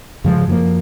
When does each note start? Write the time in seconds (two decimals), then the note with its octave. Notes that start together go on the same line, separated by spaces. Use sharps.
0.24 G2 C#3 F3 G#3
0.47 F#2 F3 G#3 A#3